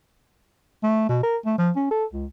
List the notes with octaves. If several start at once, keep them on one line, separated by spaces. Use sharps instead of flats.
A3
B2
A#4
A3
F3
C#4
A4
C#2